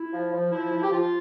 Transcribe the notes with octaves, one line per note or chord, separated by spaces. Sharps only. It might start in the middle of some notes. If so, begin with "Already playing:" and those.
Already playing: E4
F3
F3
F3 E4
F3
G4
F3 F4